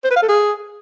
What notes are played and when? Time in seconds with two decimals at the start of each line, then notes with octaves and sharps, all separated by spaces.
0.04 C5
0.10 B4
0.16 F5
0.22 A4
0.28 G#4